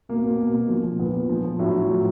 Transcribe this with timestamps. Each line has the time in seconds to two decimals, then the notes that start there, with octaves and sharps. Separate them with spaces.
0.09 B2 A#3
0.24 B2
0.39 B2
0.54 B2
0.69 F3
0.84 F3
0.99 A#2 B3
1.14 A#2
1.29 F3
1.44 F3
1.59 A2 F#3
1.75 A2
1.90 F3